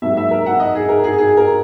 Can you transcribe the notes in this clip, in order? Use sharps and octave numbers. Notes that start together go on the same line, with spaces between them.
G#2 F#3 A#3 E5
E5
A#4
F#5
D#5
G#4
A#4
G#4
G#4
A#4